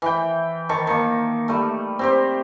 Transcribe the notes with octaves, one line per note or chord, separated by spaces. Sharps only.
E3 G5
D#3 A5 C#6
D#3 A#3
G3 A3
C4 G4 C5